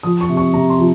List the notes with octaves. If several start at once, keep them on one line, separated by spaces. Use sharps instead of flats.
F3 D#6
C#6
C3
C#6
C3 A#5
C6
F3